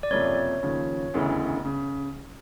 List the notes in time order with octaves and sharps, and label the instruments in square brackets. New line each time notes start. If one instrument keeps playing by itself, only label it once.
[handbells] D5
[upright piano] F#1 F2 C3 F3 [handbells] C#5
[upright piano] D#2 C#3 F3
E1 D2 C#3 E3
C#3